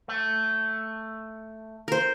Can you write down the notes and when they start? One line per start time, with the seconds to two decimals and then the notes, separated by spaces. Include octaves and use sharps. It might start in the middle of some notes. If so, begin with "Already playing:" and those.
0.08 A3
1.88 A#4 C5